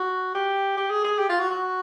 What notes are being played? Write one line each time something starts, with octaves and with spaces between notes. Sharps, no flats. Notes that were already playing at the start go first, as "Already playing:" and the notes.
Already playing: F#4
G4
G4
G#4
G#4
G4
F4
F#4
F#4